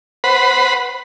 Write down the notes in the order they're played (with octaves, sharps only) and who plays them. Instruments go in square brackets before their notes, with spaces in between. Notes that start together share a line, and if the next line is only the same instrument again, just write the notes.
[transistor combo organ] B4 C5 F#5 B5